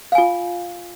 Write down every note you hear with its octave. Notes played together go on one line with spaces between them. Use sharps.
F4 F5 G#5